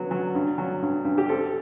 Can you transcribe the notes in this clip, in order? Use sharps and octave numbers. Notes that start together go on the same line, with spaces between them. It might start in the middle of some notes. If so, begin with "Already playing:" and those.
Already playing: F#3 B3
F#3
G2
F#3
G2
G2
G4
C4 A4